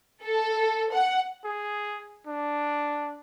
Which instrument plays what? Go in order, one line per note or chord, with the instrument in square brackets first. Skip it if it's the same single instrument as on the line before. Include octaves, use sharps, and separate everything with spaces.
[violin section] A4
F#5
[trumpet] G#4
D4